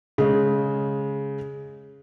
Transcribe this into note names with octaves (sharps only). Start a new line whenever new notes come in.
C#3 G#3